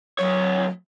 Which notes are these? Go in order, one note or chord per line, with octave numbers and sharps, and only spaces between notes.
D2 F#3 C#5